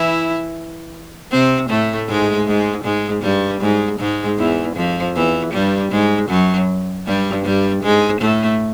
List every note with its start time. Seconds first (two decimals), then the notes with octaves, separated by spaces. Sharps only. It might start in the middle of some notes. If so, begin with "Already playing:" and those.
Already playing: E3 E4
1.31 C3 C4
1.69 A2 A3
2.08 G#2 G#3
2.47 G#2 G#3
2.84 G#2 G#3
3.23 G2 G3
3.61 G#2 G#3
3.99 G#2 G#3
4.38 E2 E3
4.76 F2 F3
5.15 E2 E3
5.53 G2 G3
5.92 G#2 G#3
6.29 F#2 F#3
7.06 G2 G3
7.45 G2 G3
7.83 G#2 G#3
8.21 A2 A3